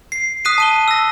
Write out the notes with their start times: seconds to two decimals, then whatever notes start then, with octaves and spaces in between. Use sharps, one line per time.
0.12 C7
0.45 D#6 F#6 B6 C7 D#7
0.58 A5 D#7 G7
0.88 E6 A#6